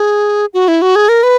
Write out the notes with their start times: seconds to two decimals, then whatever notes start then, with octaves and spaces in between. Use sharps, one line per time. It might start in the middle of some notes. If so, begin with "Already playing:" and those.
Already playing: G#4
0.54 F#4
0.68 E4
0.82 F#4
0.96 G#4
1.09 A#4
1.23 B4